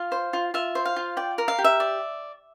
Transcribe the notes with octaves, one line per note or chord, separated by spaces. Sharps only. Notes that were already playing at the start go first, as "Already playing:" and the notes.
Already playing: F4 F5
C5
F4
F4 E5
C5
F5
F4
D5 G5
A#4
F5
G4
E5
D5